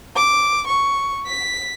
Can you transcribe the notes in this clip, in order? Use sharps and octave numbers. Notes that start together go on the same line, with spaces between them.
D6
C#6
B6